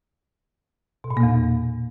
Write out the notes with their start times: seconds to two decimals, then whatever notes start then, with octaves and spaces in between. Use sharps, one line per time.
1.04 B2
1.11 A#2
1.17 A#3
1.23 E2